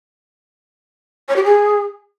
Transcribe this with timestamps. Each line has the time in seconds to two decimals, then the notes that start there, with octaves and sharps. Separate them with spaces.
1.29 C#5
1.36 G4
1.44 G#4